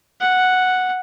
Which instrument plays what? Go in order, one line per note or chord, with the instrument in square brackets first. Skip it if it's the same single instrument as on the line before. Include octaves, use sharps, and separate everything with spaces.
[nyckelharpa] F#5